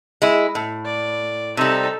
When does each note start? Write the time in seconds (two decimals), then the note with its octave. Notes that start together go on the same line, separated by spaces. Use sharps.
0.22 G#3 E4
0.55 A2
0.85 D5
1.57 C3 G3 D#4 A4